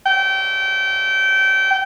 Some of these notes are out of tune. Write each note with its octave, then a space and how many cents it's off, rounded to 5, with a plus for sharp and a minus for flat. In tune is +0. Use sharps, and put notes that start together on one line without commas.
G5 -25